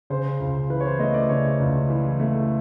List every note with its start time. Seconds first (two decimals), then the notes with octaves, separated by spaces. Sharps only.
0.10 C#3 C5
0.40 C#2
0.70 E3 B4
0.80 C#5
0.85 C5
0.99 A3 D#5
1.14 D5
1.29 C#3 C#5
1.59 C#2
1.90 E3
2.20 A3